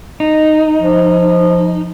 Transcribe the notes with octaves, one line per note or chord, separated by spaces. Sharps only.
D#4
F3